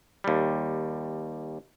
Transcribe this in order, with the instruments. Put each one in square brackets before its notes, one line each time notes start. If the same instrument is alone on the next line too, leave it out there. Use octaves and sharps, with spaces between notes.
[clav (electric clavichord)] D#2 G3